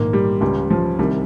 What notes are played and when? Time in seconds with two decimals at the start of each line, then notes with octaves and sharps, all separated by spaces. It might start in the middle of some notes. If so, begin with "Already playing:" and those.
Already playing: A#1 G#2 D#3 A#3
0.13 G3
0.41 C#2 C#3 G3
0.70 F3
0.99 C2 C3 D#3 G3